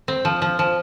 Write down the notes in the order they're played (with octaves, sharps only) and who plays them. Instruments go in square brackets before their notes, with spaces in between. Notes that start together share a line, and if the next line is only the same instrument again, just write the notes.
[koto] C4
F3
F3
F3